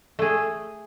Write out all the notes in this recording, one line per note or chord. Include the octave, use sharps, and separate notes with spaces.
A3 G#4